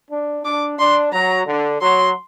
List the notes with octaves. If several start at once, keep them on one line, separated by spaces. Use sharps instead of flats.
D4
D4 D6
D4 C6
F#3 A#5
D3
F#3 C6